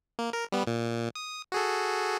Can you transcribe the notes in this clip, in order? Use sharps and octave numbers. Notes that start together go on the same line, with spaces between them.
A#3
A#4
G3 B3
A#2
D#6
F#4 G#4 A4